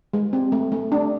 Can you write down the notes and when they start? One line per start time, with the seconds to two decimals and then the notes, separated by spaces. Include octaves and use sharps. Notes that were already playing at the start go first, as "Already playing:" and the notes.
0.13 G#3
0.33 C4
0.52 A3
0.72 A3
0.92 D4